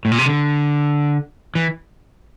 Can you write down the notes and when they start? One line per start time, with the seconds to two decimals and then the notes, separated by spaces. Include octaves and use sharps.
0.05 A2
0.11 A#2
0.19 C3
0.26 D3
1.55 E3